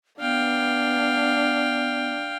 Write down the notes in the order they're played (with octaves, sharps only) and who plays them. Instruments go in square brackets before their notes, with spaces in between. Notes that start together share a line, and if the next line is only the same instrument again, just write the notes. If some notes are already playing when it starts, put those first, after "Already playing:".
[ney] B3 [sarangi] D4 [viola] F5 G5